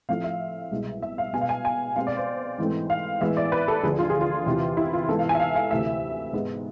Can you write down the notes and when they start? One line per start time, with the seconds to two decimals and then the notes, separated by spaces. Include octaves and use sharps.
0.09 A2 F3 A3 C4 F5
0.24 E5
0.71 C2 B2 G#3
1.02 E5
1.18 F5
1.33 B2 G#3 B3 G#5
1.41 F5
1.49 G#5
1.65 G#5
1.96 B2 G#3 C4 F5
2.07 D5
2.17 C5
2.58 G#2 E3 A3 C4
2.90 F5
3.21 A2 E3 G#3 B3 E5
3.37 D5
3.52 B4
3.68 A4
3.83 D2 D3 F3 G#4
3.99 F4
4.10 G#4
4.21 F4
4.46 E2 C3 E3
4.77 E4
4.93 F4
5.08 G#2 E3 B3 A4
5.19 F5
5.29 G#5
5.35 E5
5.40 F5
5.55 F5
5.71 D2 C3 E3 A3 E5
6.33 G#2 G#3 B3